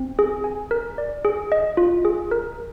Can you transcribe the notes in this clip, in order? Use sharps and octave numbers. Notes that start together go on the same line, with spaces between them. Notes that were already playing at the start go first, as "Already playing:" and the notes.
Already playing: C4
G#4
G#5
A#4
D5
G#4
D#5
F4
G#4
A#4